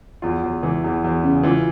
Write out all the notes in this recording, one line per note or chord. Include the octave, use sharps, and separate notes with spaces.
E2 F4
E2
E3
E2
E2
C#3
E3 F4